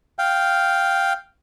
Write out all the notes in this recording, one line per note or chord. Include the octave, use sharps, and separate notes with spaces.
F5 G5